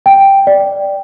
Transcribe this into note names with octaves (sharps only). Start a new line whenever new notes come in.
G5
D5